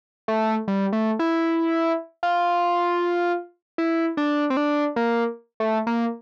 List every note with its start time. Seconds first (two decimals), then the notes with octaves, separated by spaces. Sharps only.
0.28 A3
0.68 G3
0.93 A3
1.19 E4
2.23 F4
3.78 E4
4.17 D4
4.50 C4
4.57 D4
4.96 A#3
5.60 A3
5.87 A#3